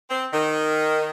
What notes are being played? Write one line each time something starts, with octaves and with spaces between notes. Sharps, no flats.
C4
D#3